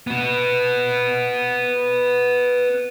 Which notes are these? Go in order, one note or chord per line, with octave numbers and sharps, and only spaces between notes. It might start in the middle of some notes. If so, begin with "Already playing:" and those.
B3 F#4